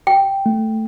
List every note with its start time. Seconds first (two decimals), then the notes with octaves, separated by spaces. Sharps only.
0.07 G5
0.46 A3